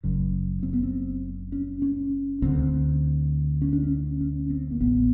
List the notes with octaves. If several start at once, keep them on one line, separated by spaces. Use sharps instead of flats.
F#1 F#2 C#3
C4
B3
C4
C#4
C#4
D2 D3 C4
C#4
D4
C#4
C#4
C4
A#3
A1 A2 B3